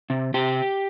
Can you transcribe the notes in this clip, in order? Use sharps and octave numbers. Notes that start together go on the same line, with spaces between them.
C3
C3 G4